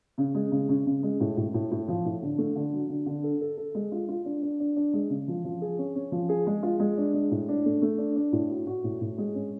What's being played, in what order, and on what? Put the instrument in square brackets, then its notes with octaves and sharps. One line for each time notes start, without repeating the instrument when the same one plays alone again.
[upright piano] C#3
G#3
C#3
C#3
C#3
G#3
A2
A2
A2
A2
F3
A2
D3
A3
D3
F#3
D3
D3
A4
A4
A4
G#3
F4
F4
D4
D4
D4
D4
G#3
C#3
F3
F3
G#4
C#4
C#4
F3
G#4
G#3
F4
G#3
D4
G#3
A2
D4
A3
A3
D4
D4
A2
F#4
F#4
A2
A2
G#3
C#4